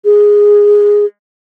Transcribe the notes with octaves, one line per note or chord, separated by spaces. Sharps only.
G#4